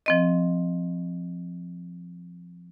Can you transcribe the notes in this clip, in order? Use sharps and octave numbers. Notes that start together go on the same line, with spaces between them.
F3 C4 D#5